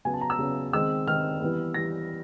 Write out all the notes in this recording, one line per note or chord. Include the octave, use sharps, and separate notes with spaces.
C#3 F#3 B3 G#5
A5
A#5
E6
C#3 F#3 B3
D#3 G#3 C4 E6
D#3 G#3 C4 F6
E3 G3 B3
E3 G3 B3 A#6